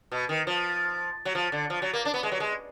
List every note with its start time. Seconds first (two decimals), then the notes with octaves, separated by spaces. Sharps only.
0.12 B2
0.29 D#3
0.47 F3
1.25 F#3
1.35 F3
1.52 D3
1.70 F3
1.82 F#3
1.93 A#3
2.05 D4
2.14 B3
2.23 G#3
2.32 F#3
2.40 G#3